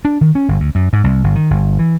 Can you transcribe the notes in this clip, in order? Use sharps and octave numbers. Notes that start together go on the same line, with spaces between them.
D4
D#3
C#4
G1
D2
F#2
G#2
C2
G1
D#3
G1
E3